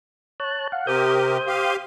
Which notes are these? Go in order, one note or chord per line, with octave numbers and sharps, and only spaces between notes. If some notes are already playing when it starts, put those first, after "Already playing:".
C#5 A5 F#6
F5 F#5
C3 G4 A#4 C5 D#6 G6
G4 F5